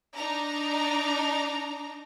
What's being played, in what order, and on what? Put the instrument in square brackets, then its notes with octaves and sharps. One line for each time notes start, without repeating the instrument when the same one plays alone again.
[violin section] D4 D#4 A#5